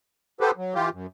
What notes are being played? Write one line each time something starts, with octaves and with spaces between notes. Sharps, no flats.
B3 G4 A4 B4 C5
F#3
E3 F4 G4
F#2